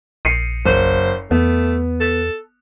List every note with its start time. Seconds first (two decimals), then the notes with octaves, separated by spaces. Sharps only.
0.25 A#1 C7 C#7 D#7
0.66 F#1 C5
1.31 E2 A3 B3
2.00 A4